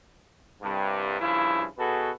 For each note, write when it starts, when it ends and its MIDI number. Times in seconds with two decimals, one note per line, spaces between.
0.61 1.18 36
0.61 1.18 43
1.20 1.65 43
1.20 1.65 49
1.20 1.65 53
1.20 1.65 64
1.78 2.09 47
1.78 2.09 66
1.78 2.09 68
1.78 2.09 69
1.78 2.09 71